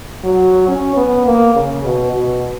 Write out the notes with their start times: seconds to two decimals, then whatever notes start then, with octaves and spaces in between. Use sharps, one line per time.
0.24 F#3
0.68 C#4
0.96 B3
1.26 A#3
1.55 C#3
1.84 B2
2.13 B2